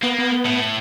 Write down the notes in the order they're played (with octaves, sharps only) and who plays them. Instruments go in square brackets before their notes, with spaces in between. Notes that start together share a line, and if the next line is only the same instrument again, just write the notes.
[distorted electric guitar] A#3 [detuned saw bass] B3
[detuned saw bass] B3
[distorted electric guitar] A2